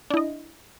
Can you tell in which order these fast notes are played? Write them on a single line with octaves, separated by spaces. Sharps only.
D4 E4 D#5